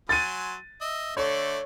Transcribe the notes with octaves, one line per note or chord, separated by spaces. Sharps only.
F#3 G#5 C6 A6 D#7
D#5 E5
D3 A3 C#5 D5